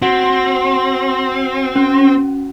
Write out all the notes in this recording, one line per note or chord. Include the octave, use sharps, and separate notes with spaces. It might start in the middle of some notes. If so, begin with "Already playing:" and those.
C4 F#4 F#5 D7
C#4